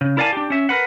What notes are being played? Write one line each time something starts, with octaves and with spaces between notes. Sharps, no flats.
C#3
E4 A#4 D5 F5 G#5 A5
D4 G4
C#4 E5
A#4 B4 F#5